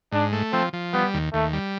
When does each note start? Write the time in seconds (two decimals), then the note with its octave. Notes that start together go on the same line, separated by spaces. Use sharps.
0.12 G#2 D4
0.33 A3
0.53 F3 C4
0.73 F3
0.94 G3 B3
1.14 D#2
1.33 D#2 A3
1.53 G3